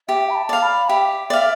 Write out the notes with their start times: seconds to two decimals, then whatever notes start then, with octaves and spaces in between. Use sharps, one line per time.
0.09 G4 E5
0.30 B5
0.36 A5
0.49 D5 F5
0.62 B5
0.89 G4 E5
1.30 D5 F5